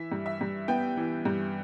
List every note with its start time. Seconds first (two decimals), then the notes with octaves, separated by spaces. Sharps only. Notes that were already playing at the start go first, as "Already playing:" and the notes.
Already playing: E3 E5
0.12 G2
0.26 E5
0.41 G2
0.68 B3 G5
0.97 E3
1.25 G2